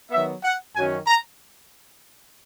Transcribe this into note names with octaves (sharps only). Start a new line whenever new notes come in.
D#3 F#3 B3 E5
F#5
F#2 D#3 F#3 C#4 G#5
A#5